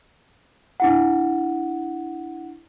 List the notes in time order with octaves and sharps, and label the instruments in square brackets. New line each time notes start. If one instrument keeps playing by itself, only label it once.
[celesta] D4 E4 F#5